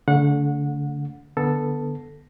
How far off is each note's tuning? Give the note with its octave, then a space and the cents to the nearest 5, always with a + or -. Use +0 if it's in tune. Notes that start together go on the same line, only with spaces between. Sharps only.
D3 -35 A3 +0 F#5 -25
D3 +0 B3 -10 A4 +0